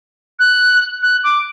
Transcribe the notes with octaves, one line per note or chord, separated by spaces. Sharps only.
F#6
F#6
D6